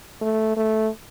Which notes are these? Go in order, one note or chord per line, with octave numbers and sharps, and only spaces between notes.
A3
A3